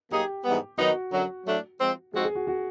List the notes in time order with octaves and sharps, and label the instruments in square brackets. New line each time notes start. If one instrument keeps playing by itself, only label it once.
[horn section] F#3 A#3 D#4 G#4 [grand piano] G4
[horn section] G#2 E3 G3 B3
[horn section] D#3 F#3 B3 D#4 [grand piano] F#4
[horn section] F#2 D3 F#3
A2 F#3 A3 D4
F3 G#3 C4
[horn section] F3 G#3 C4 D#4 F#4 [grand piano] G#4
[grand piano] G#4
F#4
F#4